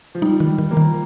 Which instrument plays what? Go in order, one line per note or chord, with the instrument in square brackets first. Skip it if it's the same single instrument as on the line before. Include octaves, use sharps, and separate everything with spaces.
[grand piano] F3
[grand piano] G3 [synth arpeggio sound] D#4
[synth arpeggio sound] D#3
[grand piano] G3
[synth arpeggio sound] D#3
[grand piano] F3 A#3
[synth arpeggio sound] D#3